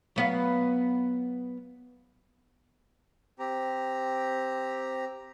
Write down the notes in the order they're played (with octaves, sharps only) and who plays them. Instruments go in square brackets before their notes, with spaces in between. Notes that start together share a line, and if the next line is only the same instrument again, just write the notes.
[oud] F#3 B3 F5
[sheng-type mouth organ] C4 G4 A#5